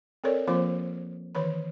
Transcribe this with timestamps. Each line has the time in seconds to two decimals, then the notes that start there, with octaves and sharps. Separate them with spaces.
0.24 C4 A4 A#4 C#5 D5
0.48 F3 A#3 C4 F4 C5 D6
1.35 D#3 E3 B4 C#5 B5